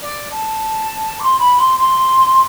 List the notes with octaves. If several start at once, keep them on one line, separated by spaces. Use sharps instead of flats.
D5
A5
D6
C6
B5
C6
C6